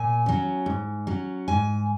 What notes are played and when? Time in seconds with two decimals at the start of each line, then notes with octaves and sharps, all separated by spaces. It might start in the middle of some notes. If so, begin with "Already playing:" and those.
Already playing: A#2 G#5
0.26 F#3 C#4
0.66 G#2
1.07 F#3 C#4
1.48 G#2 G#5